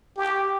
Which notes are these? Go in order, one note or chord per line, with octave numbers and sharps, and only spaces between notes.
G4